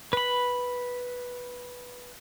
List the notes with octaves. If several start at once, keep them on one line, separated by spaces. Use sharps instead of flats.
B4 B5